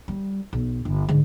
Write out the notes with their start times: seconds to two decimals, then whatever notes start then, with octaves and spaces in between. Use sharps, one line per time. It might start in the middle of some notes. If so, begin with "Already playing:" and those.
0.08 G3
0.53 B1
0.85 G1
1.09 G#2 D3